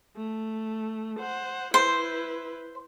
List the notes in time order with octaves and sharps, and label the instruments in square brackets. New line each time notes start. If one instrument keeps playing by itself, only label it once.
[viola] A3
C5 F#5
[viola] E4 B4 [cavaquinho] C5